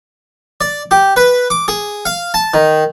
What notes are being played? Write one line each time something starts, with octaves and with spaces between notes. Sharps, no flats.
D5
G4
B4
D6
G#4
F5
A5
D#3